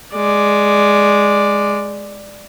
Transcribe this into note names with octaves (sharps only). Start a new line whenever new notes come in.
G#3 D5